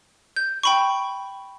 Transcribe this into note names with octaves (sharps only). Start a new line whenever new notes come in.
G6
G5 B5 C#6